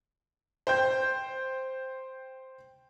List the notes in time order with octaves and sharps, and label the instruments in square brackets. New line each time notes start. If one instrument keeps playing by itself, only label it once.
[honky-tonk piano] C5 G5 G6